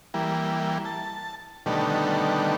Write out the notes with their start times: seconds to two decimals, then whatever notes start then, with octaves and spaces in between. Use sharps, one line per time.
0.14 E3 G3 A#3
0.85 A5
1.66 B2 D3 D#3 G3 A3